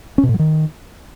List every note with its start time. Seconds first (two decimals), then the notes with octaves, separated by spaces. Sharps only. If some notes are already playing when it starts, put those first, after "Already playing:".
0.18 C#4
0.23 B2
0.29 A2
0.34 F#3
0.39 D#3